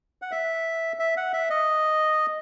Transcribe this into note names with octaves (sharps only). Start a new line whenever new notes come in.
F#5
E5
E5
F#5
E5
D#5